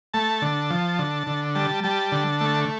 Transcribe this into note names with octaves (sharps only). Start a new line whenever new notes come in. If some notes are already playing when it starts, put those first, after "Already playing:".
A3 A5
D3
F3
D3
D3
G3 A5
G3 A5
D3
A3